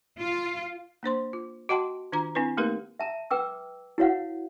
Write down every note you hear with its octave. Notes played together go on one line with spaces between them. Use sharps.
F4
A#3 D4 C5 C6
F4
F#4 D#5 F#5 G5 A5 C6
D#3 D4 F4 A#5
C4 D4 E4 B4
A3 A#3 D#4 G4 A#4 B4
E5 A5 A#5
B4 G5 D6 E6
E4 F#4 C#5 F5 F#5